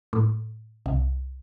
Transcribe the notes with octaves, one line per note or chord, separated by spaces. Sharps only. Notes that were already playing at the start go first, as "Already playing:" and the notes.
A2
C2